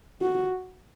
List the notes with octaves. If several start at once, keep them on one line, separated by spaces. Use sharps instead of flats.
F#4